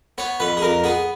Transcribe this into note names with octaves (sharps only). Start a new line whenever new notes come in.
B3 C#5
F2 B4
G#4
F2 A#4
B3 G#4